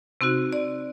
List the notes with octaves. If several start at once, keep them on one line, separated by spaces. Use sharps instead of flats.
C3 C4 D#4 F#4
D5